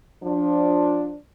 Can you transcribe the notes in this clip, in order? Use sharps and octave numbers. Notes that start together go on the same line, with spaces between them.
F3 D4